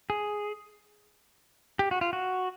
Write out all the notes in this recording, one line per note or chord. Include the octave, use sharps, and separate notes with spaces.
G#4
G4
F#4
F4
F#4